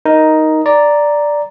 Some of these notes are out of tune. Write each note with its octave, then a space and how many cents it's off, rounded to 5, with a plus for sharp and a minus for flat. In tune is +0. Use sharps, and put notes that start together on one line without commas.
D#4 +5 A#4 +0
D5 +0 A#5 +0